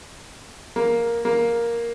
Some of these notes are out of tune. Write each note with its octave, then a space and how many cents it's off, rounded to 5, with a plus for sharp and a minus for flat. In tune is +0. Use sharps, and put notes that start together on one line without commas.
A#3 +5
A#3 +5